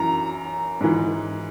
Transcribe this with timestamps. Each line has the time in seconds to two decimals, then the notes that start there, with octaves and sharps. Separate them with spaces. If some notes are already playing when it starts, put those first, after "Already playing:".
Already playing: F#2 E3 A#5
0.81 G#2 E3